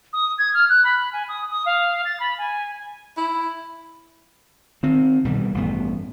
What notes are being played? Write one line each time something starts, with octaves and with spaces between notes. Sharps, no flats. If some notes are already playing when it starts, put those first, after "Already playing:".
D#6
G#6
F6
F#6
B5
G#5
D#6
D#6
F5
A6
B5
G#5
E4
D#3 C4
B2 D#3 E3 G3
A1 G2 B3